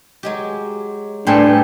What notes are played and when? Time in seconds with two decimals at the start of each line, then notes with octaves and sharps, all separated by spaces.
0.23 F#3 G#3 G4
1.27 A2 G3 D4 A4 B4 C5 G5 G#5